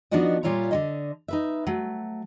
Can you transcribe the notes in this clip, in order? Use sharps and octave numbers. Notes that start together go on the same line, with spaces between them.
F3 B3 D4 D#4 F#4 D#5
A#2 G3 F4 C#5 E5 A#5
D3 F#4 D#5
D#4 B4 E5
F#3 A3